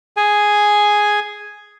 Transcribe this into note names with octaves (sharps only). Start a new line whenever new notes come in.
G#4 G#5